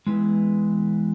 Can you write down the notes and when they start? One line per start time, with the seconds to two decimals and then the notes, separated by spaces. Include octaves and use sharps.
0.07 E2 C#3 E3 G#3